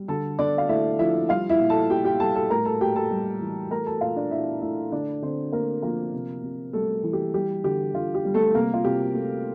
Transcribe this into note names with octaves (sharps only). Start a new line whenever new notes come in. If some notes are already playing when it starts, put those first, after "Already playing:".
Already playing: G3
D3 A4 A5
D3 D4 D5
F5
A3 E4 E5
F3 E4 E5
G3 F4 F5
E4 E5
A#2
A4 A5
A#2 G4 G5
G4 G5
G3 A4 A5
A4 A5
A2 A#4 A#5
A4 A5
A2 G4 G5
A4 A5
G3
E3
A3 A#4 A#5
A4 A5
A#2 F4 F5
D4 D5
A#2 E4 E5
A3 E4 E5
D3 D4 D5
D3 C4 C5
A3 A#3 A#4
F3 A#3 A#4
C3
C3
G3 A3 A4
E3
G4
G3 G4
D3 G4
D3 F4
G4
G3
A3 A4
C3 A#3 A#4
F4
C3 G4
A3